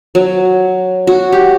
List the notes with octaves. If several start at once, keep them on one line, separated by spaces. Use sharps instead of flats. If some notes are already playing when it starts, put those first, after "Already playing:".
F#3
F#4
G4